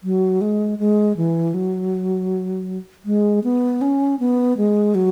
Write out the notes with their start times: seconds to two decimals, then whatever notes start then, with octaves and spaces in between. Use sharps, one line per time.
0.04 F#3
0.41 G#3
0.79 G#3
1.17 E3
1.54 F#3
3.06 G#3
3.44 B3
3.81 C#4
4.20 B3
4.57 G#3
4.95 F#3